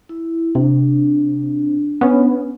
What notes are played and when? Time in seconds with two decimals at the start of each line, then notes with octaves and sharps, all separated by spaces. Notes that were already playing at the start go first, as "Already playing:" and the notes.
0.09 E4
0.55 C3 D4
2.01 B3 C#4